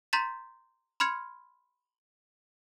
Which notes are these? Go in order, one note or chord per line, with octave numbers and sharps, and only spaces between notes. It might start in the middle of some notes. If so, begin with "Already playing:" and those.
A#5 C6 G6 A6 B6 E7
B5 C6 F6 G#6 C#7